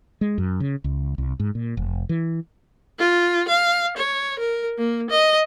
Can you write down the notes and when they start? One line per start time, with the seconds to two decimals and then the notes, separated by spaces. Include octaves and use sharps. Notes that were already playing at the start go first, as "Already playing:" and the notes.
0.21 G#3
0.38 F#2
0.60 C#3
0.84 C#2
1.18 C2
1.40 G#2
1.55 A#2
1.77 F1
2.09 E3
2.99 F4
3.48 F5
3.97 C#5
4.39 A#4
4.78 A#3
5.10 D#5